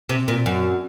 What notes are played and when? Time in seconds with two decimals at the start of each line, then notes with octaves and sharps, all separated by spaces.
0.09 C3
0.28 A#2
0.46 F#2